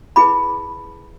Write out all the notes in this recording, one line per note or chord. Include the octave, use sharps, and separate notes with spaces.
E4 G#4 B4 B5 D6